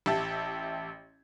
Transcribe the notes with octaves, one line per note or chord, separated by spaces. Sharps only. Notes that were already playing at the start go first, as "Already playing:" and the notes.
A1 G4 E5 A5